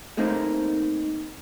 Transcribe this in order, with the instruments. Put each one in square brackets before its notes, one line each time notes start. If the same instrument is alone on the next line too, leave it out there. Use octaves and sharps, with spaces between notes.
[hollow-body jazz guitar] A3 A#3 C4 D#4